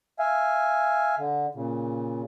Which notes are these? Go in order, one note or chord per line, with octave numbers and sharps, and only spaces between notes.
E5 F5 G#5
D3
A#2 C#3